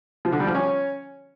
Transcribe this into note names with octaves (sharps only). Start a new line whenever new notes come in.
F3
D3
G3
F3
C#4